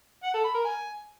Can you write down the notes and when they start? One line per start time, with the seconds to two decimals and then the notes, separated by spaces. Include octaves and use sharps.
0.24 F#5
0.34 A4
0.44 B5
0.54 A#4
0.65 G#5